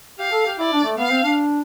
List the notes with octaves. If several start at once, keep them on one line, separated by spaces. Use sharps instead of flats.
G4 F5
A4
G4
E4 D5
D4
A3
B3 F5
C4
D4